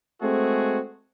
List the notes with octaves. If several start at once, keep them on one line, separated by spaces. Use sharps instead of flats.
G#3 A3 C4 F#4 G#4